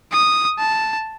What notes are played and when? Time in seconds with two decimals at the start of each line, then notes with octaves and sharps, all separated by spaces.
0.12 D#6
0.59 A5